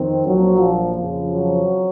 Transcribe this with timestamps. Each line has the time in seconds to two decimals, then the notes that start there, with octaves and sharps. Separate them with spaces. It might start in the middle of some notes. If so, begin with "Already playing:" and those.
Already playing: F2 D#3 C4
0.27 A#1 A#2 F3 F#3
0.60 F3
0.95 F2 C#3 F3
1.28 F#3